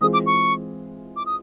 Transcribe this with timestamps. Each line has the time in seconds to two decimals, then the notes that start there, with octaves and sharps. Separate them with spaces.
0.01 E3 G#3 C4 F4 G#4 D#6
0.13 D6
0.26 C#6
1.16 D6
1.26 D#6